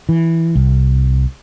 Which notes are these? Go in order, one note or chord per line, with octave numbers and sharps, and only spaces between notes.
E3
C2